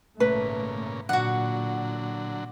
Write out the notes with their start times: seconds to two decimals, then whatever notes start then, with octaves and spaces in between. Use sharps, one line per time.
0.20 G#1 A#2 C#3 A3 B4
1.09 A#2 D3 F#3 F#4 F#5